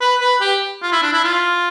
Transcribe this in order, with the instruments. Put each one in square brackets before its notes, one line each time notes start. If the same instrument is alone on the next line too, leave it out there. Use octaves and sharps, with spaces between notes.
[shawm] B4
B4
G4
F4
E4
D4
E4
F4